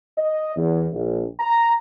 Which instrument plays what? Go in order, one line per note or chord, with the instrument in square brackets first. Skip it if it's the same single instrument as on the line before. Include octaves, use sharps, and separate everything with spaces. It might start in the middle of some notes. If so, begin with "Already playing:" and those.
[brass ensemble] D#5
E2
A#1
A#5